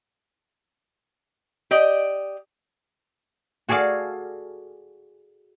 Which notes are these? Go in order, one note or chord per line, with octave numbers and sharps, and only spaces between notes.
G4 D5 D#5
F#4 G#4 A4 D5 F5